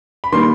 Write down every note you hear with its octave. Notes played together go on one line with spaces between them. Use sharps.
B5
D#3 G3 A#3 C6